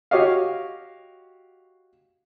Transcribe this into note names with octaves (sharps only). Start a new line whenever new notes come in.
F#4 G4 C#5 D#5 F5